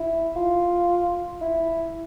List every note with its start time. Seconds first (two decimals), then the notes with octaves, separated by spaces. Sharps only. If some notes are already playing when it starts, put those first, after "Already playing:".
Already playing: E4
0.36 F4
1.41 E4